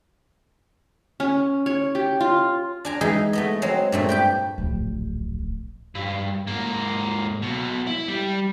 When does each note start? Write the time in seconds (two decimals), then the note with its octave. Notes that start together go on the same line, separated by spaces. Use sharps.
1.20 C#4
1.66 C#5
1.95 G4
2.20 F4
2.85 D4 G#5 A#5
3.01 E3 G#3 D#4 G#4 B4
3.33 A3 B3 D#5
3.62 F#3 G#3 C4
3.92 G2 A#2 A3
4.09 G4 B4 G5
4.58 D1 A#1
5.95 G2
6.47 G#2 A#3
7.42 B1 B2
7.87 E4
8.08 G3